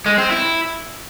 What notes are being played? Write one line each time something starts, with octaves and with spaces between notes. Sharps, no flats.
G#3
C4
E4